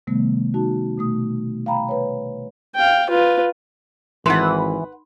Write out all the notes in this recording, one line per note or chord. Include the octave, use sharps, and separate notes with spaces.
C3 D#3 G3 A3 B3
D#4 F#4 A5
B2 A3 D#6
F5 G5 A#5 B5
B4 C#5
F5 G5
F4 B4
G#1 E3 D#4 B4 F#5 B5 C6